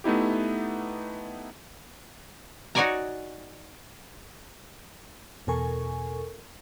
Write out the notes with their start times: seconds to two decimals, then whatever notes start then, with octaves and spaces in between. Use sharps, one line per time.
0.04 A3 B3 D#4 E4 G4
2.75 D#4 F#4 C#5 D5 G#5 A#5
5.47 E2 B2 A4 A#4 G#5 C#6